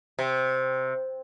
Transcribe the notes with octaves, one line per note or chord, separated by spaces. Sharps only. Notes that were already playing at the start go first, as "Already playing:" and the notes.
C3